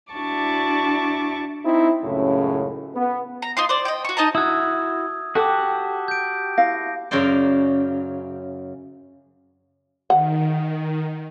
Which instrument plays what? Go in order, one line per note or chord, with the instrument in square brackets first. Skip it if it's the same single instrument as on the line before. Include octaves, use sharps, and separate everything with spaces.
[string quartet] D4 E4 F#4 A5 C#6 D6
[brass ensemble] C4 D#4 E4
C#2 F#2 A2 C#3
B3
[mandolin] A#5
D#4 F4 C6
C5 D5
D#5 G5
F#4 C#6
D#4 D#5 A5 A#5
[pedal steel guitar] E4 F#4 [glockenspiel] D#6 E6 G#6
[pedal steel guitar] F#4 G4 F#5 [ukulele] A4 G5 [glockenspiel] A5 D6
[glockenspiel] G6 D7
[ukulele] E4 F5 [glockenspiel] A#6
[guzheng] F#2 C#3 C#4 A#4 C5 D5
[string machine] D#3 [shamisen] F#5